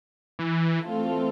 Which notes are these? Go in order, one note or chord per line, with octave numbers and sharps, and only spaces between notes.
E3
E3 A3 C4 F4 A4